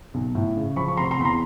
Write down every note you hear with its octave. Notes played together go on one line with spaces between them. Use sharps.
B1
A2
C#3
F3 B5 C#6
C#6
F1 A#5 C6
A#5 C6
E2 B5
A#5 C6